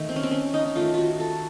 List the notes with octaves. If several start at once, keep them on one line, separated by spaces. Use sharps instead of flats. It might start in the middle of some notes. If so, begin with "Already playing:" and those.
Already playing: D#3 A3
C4
C#4
C4
C#4
D#4
D#4
D#3 A3 F4
F4 F#4
A4